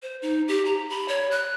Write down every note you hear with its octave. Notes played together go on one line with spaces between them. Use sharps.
C5
D#4
G4
A#5
B5
C#5
F#6